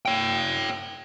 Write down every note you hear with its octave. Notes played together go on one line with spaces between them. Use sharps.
C#5 G5